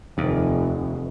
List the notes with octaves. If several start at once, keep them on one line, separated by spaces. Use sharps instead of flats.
F1 D#2